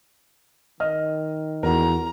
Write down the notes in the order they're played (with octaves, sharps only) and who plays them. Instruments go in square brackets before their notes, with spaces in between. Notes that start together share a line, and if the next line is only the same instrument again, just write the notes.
[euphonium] D#3 [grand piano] D#5 F6
[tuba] E2 [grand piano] F#4 A#4 [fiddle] A#5